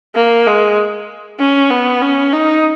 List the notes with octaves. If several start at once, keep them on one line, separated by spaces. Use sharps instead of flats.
A#3
G#3
C#4
B3
C#4
D#4